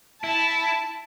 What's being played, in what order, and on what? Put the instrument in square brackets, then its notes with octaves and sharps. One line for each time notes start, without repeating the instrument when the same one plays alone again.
[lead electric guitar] E4 [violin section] A5